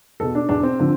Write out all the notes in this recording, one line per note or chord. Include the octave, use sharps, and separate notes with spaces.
E2 B2 A4
D4
E2 B2 D4
C4
D3 F3